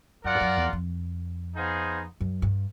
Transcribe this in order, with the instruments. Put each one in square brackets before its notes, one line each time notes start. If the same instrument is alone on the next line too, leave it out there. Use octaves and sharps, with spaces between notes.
[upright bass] F#2 [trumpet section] F4 A#4 D5 F#5
[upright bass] G2
F#2
E2
F2
[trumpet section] B3 D#4 G#4 C5 F5
[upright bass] F#2
G2